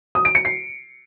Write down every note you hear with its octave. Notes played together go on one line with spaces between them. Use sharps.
D#6
D7
C#7
C7